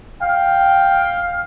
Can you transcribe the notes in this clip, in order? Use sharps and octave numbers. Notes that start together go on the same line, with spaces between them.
F5 G5